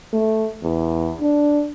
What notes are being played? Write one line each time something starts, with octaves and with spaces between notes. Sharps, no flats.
A3
E2
D4